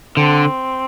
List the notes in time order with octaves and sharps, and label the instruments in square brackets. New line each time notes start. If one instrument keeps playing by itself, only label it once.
[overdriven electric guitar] D3 [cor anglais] C4